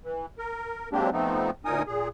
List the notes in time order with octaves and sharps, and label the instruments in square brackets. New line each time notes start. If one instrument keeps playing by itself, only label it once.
[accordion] E3
A#4
F#3 G#3 A#3 C4 D4 G4
F3 A3 B3 C4 D#4
D2 A#2 D#4 A#4 G#5 D#6
A#2 G#4